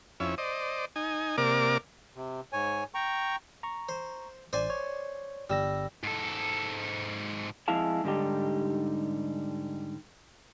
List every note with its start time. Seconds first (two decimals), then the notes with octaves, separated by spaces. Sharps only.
0.20 F2 C#4 E4
0.38 C5 D5 D#5
0.96 D#4 G#5
1.38 C3 A#3 A#4 D5 D6
2.16 C3
2.53 G#2 C#5 G#5
2.94 G5 A#5 C#6
3.63 A#5 C#6
3.89 C5
4.53 A1 C5 D5 G#5
4.70 C#5
5.50 G1 G3 E6 A#6
6.03 G#2 A4
7.68 F2 G#3 E4 G#4 F5 A5
8.04 G#2 D3 G3 D#4 G4